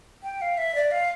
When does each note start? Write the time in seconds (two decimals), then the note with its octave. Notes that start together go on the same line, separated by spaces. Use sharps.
0.23 G5
0.41 F5
0.58 E5
0.75 D5
0.91 F5